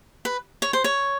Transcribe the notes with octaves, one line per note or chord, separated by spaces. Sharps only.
B4
C#5
C5
C#5